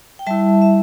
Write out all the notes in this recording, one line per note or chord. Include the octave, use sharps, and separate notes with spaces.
G5
G3 E4 E5 A5
E5